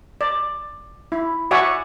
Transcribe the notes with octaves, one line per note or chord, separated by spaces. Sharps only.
D5
E4
F#4 C#5 D5 E5 F#5 G#5